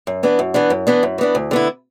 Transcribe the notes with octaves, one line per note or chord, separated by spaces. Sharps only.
F#2
E3 B3 D4
F#2
E3 B3 D4
F#2
E3 B3 D4
F#2
E3 B3 D4
D2
D3 B3 E4